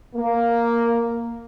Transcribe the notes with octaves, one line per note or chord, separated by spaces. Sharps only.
A#3